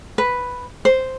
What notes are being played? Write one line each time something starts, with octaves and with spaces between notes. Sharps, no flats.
B4
C5